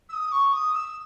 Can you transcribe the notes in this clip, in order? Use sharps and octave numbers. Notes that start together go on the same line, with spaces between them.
E6
D#6
C#6
D#6
E6